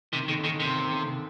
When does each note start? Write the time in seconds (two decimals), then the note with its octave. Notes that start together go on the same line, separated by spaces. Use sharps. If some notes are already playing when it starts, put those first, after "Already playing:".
0.13 C3 D#3
0.28 D3 D#3
0.39 C#3
0.44 D3 D#3
0.60 C3 D#3
0.76 D#3
0.91 D3
1.07 D3